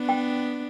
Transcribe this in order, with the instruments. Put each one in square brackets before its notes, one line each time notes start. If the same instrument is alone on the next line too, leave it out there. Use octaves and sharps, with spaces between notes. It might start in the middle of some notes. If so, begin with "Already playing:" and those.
Already playing: [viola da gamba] B3 D4
[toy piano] G5